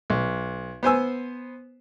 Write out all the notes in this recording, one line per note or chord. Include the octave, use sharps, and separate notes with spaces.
B1
B3 C5 G#5 E6